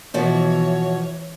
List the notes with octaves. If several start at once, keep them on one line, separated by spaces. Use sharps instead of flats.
B2 E3 F3 F#4 C#5